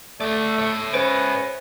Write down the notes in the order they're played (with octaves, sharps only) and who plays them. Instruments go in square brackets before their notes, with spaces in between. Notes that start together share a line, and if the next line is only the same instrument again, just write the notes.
[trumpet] A3 [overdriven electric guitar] D5 E5
[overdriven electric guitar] C#5 E5
[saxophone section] G#3 B3 C#4 [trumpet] B4 [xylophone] C5 D7